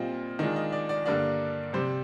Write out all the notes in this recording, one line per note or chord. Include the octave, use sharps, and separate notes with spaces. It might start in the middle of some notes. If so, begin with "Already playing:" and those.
Already playing: A#2 G3 C4 F4 D#5
D#3 G#3 D4 F4 D#5
D#5
D5
D5
G2 D3 G3 A#3 D4 D5
C3 G3 C4 C5